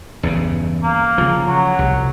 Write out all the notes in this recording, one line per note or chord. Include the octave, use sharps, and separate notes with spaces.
E2 G2 C#3
A#3
C#3 F3
F#3
C2